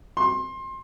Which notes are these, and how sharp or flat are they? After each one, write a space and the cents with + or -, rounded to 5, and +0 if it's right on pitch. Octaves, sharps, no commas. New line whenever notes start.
C6 +25